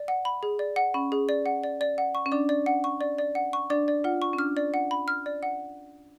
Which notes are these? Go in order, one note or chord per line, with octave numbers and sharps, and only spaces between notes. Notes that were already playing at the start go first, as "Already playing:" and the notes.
Already playing: D5
F#5
B5
G#4
D5
F#5
C#4 B5
G#4
D5
F#5
D5
D5
F#5
C#6
C#4
D4 D5
D5
F#5
C#6
D5
D5
F#5
C#6
D4 D5
D5
F4 F#5
C#6
C#4
D4 F6
D5
F#5
B5
F6
D5
F#5